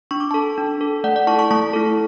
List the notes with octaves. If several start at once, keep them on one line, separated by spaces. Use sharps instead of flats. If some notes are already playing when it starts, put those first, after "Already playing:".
D4 C#6
D6
A4 A5 C#6
D4
A4
A3 D5 F#5
D5 F#5
E4 A4 A5 C#6
A5 C#6
A3 A5 C#6
E4 A4